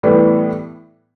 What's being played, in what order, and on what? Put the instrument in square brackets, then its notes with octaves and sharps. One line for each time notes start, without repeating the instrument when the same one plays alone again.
[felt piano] A2 E3 G3 B3